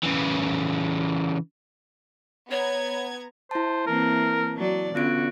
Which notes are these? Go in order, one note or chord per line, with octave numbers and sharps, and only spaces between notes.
C#3 E3
B3 C#5 A#5 G#6
E4 C5 A5
E3 A#3 C4 A#4
F#3 D5
D3 B3 C#4 F4 F#4 D7